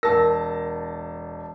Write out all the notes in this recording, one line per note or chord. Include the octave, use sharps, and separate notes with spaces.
E1 A#4 A5 A#6